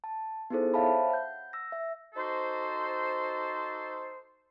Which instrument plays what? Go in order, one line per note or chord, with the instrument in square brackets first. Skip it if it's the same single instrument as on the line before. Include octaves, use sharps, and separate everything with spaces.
[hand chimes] A5
B3 D#4 E4 G#4 A4 C5
C5 C#5 E5 F5 A5 B5
F#5 G6
E6 A#6
E5
[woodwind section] D#4 F#4 A4 C5